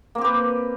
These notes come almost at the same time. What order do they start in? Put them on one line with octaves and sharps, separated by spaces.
A#3 C4 G4 B4